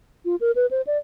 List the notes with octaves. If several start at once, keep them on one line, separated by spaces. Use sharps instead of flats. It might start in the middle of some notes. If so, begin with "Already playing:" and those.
F4
A#4
B4
C5
D5